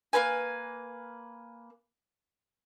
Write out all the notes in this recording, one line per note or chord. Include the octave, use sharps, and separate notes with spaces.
A#3 C#4 B4 G#5